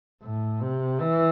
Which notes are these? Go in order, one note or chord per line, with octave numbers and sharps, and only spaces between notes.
A2
C3
E3